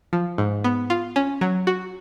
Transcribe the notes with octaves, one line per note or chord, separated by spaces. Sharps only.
F3
G#2
B3
F4
C#4
F#3
F#4